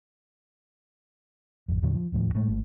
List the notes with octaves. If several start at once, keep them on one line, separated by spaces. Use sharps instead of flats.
G#1 F2
E2 A#2 D3 F#3
F3
D1 D#2 A2 F3
A2 G#3 A3
G#1 A3